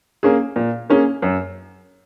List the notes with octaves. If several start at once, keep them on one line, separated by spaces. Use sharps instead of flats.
A#3 C#4 G#4
A#2
A#3 C#4 G#4
F#2